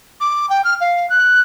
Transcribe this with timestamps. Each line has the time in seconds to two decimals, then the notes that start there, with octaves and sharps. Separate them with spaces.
0.20 D6
0.49 G5
0.64 F6
0.80 F5
1.09 F#6